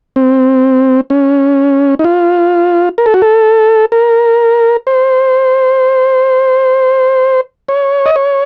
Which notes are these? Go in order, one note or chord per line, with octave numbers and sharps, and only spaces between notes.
C4
C#4
D#4
F4
A#4
A4
F#4
A4
A#4
C5
C#5
D#5
C#5